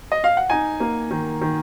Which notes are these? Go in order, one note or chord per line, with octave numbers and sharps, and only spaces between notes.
D#5
F5
F#5
D#4 G#5
A#3
D#3
D#3